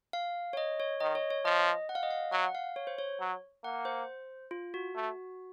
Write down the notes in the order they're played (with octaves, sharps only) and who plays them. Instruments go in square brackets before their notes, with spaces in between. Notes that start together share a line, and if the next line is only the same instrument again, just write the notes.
[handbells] F5
C#5
D#5
C#5
[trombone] D#3 [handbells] D#5
[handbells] C#5
C#5
[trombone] F3 [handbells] D#5
[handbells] F#5
F5
D#5
F5
[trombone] F#3 [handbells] F#5
[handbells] F5
C#5
C5
C#5
[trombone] F#3
[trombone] A#3 [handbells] F#5
[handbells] C5
F4
F#4
[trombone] A3